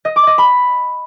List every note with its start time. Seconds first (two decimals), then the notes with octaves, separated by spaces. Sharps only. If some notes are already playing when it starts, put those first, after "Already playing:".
0.05 D#5
0.16 D6
0.27 D#5
0.38 B5